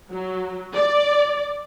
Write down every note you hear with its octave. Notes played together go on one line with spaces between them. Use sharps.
F#3
D5